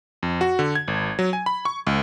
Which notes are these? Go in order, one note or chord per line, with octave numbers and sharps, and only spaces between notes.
F2
F#4
D3
G#6
G#1
F#3
G#5
B5
C#6
C#2